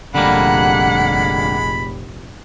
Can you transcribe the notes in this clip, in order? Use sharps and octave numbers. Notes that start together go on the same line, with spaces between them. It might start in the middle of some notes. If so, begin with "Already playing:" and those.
F1 A#2 D3 G3 G#3 A#3 F#5 B5